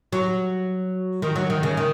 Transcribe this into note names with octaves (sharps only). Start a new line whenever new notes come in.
F#3
D#3
F#3
D#3
C#3
D#3